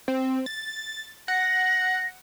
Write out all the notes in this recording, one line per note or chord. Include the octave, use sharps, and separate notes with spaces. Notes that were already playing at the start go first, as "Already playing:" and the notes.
C4
A6
F#5 A#6